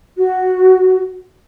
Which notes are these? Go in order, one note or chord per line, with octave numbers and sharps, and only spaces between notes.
F#4